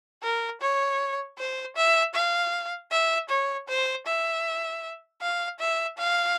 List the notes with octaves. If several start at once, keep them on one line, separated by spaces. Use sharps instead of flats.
A#4
C#5
C5
E5
F5
E5
C#5
C5
E5
F5
E5
F5